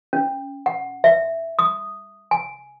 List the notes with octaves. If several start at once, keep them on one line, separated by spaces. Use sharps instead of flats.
C#4
F#5
E5
D#6
G#5